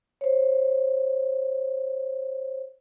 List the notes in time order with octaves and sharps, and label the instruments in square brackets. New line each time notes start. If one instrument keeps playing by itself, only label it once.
[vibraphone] C5 C#5